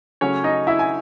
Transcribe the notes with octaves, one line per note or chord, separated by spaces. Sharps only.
C#3 F#3 A3 C#4 C#5
D#4 D#5
E4 E5
G#5